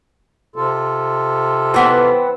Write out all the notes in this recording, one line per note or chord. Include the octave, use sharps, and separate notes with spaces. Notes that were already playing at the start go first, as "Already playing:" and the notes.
C3 F4 A4
E3 B3 C4